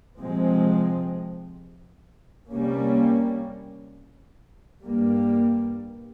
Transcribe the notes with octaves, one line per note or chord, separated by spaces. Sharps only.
C3 F3 G#3 C4
C3 G3 A#3 C#4
G2 G3 A#3